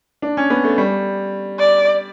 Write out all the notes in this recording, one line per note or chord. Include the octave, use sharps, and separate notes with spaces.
D4
C#4
B3
A3
G3
D5